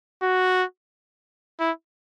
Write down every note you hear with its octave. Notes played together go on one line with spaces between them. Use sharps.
F#4
E4